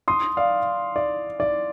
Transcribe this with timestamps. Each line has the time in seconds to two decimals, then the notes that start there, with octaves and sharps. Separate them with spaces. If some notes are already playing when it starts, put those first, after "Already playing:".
0.08 C6 D#6
0.37 D5 F5
0.96 D5
1.40 D5